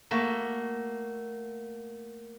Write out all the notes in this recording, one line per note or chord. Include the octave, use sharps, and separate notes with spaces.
A3 A#3 F#4